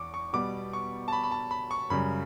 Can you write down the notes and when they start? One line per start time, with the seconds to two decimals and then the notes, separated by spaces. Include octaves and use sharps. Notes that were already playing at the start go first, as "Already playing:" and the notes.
Already playing: E2 C#6 D6
0.14 C#6
0.33 B2 G3 B3 D6
0.73 C#6
1.08 A5
1.13 B5
1.23 B5
1.31 A5
1.51 B5
1.71 C#6
1.90 F#2 C#3 G3 B5